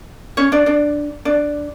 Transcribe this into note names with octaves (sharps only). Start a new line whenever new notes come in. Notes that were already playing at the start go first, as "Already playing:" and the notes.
C#4 C#5
D4 D5
D4 D5
D4 D5